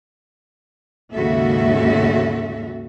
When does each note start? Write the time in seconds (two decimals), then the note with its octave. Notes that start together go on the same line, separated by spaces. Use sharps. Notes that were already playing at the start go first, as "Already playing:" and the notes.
1.13 D#2 G#2 C#3 F#4 A4 E5